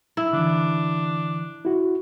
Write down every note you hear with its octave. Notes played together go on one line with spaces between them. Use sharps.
E4
D3 E3 D4
E4 F#4